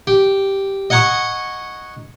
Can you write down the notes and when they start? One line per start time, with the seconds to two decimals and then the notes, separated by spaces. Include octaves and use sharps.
0.07 G4
0.90 D#5 F#5 G#5 A#5 C#6 D#6